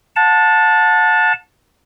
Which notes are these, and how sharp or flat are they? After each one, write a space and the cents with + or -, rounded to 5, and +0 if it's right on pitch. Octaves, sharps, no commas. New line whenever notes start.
F#5 -35 A5 +0